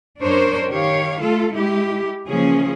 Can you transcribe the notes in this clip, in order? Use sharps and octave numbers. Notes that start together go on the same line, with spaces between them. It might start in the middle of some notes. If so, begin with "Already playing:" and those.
F#2 D4 A#4 C5 C#5
D#3 G4 C#5 F5
A3 F4 A4
G#3 E4 G4
C#3 E3 F3 A#3 C#4 G#4